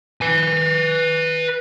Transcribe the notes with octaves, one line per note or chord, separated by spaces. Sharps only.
B4 G#5